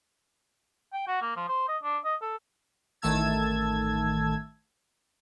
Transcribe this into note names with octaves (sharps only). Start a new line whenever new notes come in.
G5
F#4
A#3
F3
C5
D#5
D4
D#5
A4
A1 D#3 A3 A5 E6 G#6